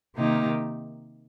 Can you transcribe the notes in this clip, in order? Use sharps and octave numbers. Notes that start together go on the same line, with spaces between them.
C3 D#3 A#3 D#4 G4